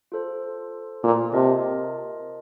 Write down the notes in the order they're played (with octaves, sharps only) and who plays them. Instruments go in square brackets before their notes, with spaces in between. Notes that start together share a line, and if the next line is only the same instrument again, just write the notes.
[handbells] F4 A4 C5
[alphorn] A#2
[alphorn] C3 [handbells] F4 A#4 D#5 A5